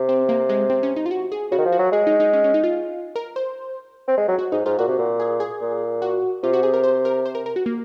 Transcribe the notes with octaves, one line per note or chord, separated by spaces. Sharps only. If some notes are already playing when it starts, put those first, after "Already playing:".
Already playing: C3
C4
A#3
G#3
C4
C#4
D#4
F4
F#4
G#4
C#3 F#4
D#3
F3
F#4
F#3
G#3 G#4
D#4
D#4
C#4
C#4
D#4
F4
A#4
C5
C4
G#3
F#3
F#4
G#2 D#4
G#2 F4
A#2 F#4
C3
A#2
G#4
G#4
A#2
F#4
C3 F4
F#4
G#4
A#4
C5
A#4
C5
A#4
A#4
F#4
A#3